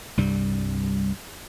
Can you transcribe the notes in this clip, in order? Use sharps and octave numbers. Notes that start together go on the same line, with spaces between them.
C2 G2 G3